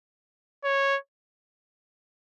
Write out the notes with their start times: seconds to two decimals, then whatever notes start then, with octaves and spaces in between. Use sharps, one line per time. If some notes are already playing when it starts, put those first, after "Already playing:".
0.64 C#5